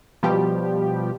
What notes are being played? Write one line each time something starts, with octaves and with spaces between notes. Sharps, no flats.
B2 F3 G3 G4